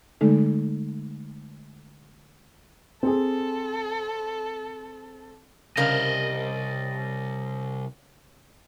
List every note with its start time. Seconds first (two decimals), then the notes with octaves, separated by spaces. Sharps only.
0.21 D3 G#3 A3 D#4 A4
3.03 C4 G#4 A4
5.77 C2 C#3 A#4 D5 D#5